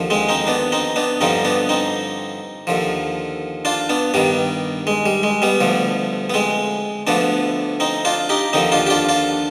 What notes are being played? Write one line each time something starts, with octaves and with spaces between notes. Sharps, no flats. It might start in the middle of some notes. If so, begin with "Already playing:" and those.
Already playing: D#2 D3 F3
G#3 C4
C4 D#4
B3 D4
C4 D#4
B3 D4
G2 D3 F3 C4 D#4
B3 D4
C4 D#4
D#2 D3 F3
D4 F4
B3 D4
G2 D#3 G3 B3
G#3
G3
G#3
G3 B3
D2 D3 F3
B3
G#3 C4
D2 D3 F3 B3 D4
C4 D#4
D4 F4
D#4 G4
D#2 D3 F3 C4 D#4
D4 F4
G4
D4 F4
D4 F4